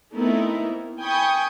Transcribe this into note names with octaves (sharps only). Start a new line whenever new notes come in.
A3 B3 C4 D#4 E4 A#4
A#3
G5 G#5 B5 C#6 D#6